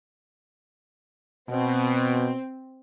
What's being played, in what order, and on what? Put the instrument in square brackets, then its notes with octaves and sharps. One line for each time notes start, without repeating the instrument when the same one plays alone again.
[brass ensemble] B2 [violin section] C4